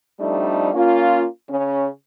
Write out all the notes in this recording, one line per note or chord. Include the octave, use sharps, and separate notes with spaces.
F2 G3 A3 D4 D#4
A#3 C#4 F4
C#3 C#4